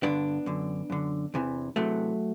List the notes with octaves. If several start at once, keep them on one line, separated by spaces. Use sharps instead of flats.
G2 D3 B3 D4
F#2 D3
F#2 D3
E2 C3 E3
E2 C3 E3 F#3 A3